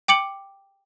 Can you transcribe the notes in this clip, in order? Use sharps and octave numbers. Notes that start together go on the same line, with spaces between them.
G5 D6 C#7 F#7